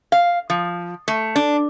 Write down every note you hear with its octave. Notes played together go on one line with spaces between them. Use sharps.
F5
F3
A3
D4